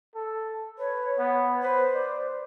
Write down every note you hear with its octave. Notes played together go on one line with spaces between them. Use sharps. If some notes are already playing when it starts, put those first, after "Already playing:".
A4
B4 C#5
B3
B4 C5
D5